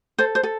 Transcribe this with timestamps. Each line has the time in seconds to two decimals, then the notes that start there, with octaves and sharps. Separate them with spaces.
0.18 A4 C5
0.35 C5
0.43 A4